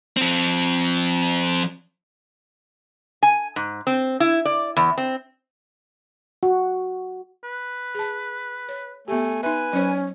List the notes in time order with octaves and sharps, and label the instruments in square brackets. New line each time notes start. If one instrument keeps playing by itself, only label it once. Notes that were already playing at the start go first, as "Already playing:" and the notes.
[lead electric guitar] F3 C4
[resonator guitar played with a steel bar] G#5
G#2
C4
E4
D5
E2
C4
[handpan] F#4
[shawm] B4
[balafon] G#4 A5
C#5
[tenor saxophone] A3 [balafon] B3 G4 [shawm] G#5
[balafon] D#4 E5 [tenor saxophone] B4 [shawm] G#5
[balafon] F#3 C5 [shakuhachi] C#4